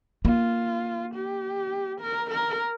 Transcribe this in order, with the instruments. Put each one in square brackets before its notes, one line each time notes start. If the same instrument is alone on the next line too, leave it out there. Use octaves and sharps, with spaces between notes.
[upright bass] A#3 [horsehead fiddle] F4
[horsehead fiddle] G4
A#4
A#4